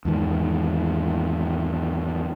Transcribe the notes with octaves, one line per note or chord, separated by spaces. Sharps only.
E2 G#2 D#3